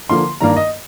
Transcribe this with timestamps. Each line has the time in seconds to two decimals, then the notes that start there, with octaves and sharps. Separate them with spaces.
0.09 D3 F3 A#3 C6
0.41 G2 D#3 A#3 D4 A#5
0.56 D#5